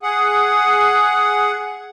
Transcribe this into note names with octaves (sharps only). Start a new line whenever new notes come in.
G#4 F#5